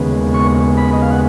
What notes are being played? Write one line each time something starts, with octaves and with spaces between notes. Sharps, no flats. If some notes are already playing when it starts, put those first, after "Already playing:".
Already playing: D#2 C#3 G#3 B3
C#6
B5
D#5
F5
F#5